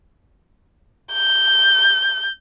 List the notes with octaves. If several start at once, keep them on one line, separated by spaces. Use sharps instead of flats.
G6